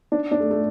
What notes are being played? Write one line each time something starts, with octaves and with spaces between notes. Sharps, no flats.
D4
D4
A3
A3